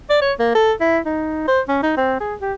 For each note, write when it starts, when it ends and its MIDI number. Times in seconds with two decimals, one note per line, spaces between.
0.10 0.17 74
0.21 0.33 73
0.39 0.53 58
0.55 0.73 69
0.81 0.99 64
1.05 1.45 63
1.48 1.61 72
1.68 1.81 61
1.83 1.93 63
1.97 2.20 60
2.20 2.35 68
2.41 2.54 67